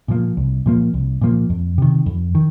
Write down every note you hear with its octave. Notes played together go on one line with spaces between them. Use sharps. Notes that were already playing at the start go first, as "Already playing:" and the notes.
A#2 F3 A#3
C2
A#2 F3 A#3
C2
A#2 F3 A#3
F2
C3 D#3
F2
D#3